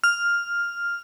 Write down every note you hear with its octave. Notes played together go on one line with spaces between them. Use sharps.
F6